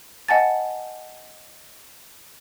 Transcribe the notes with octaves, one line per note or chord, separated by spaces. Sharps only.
D#5 F#5 G#5 A5 A6